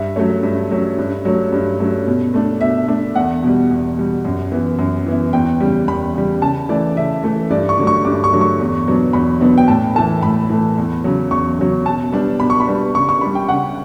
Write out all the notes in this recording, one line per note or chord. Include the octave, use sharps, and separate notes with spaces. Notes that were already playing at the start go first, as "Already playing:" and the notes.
Already playing: G2 E5
F#3 A3 C#4
G2
F#3 A3 C#4
G2
F#3 A3 C#4
G2
F#3 A3 C#4
B2
A3 D4
B2 E5
A3 D4
E2 F#5
B2 G3
E2
B2 G3
F#2
E3 B3 E4
F#2
E3 B3 E4
E2 G5
C#3 G3
E2 B5
C#3 G3
C#3 A5
E3 A3 D5
C#3 E5
E3 A3
G2 D5
C#6
D3 F#3 A3
C#6
G2 D6
C#6
D3 F#3 A3
C#6
E2
B2 F#3 B3 D4
E2 B5
B2 F#3 B3 D4
G5
A2 A5
E3 A3 A5
A2 B5
E3 A3
E2
C#3 F#3
E2 C#6
C#3 F#3
B2 A5
G3 B3 D4
B2 B5
C#6
B5
G3 B3 D4
C#3 C#6
C#6
G3 D4 B5
G5
C#3 F#5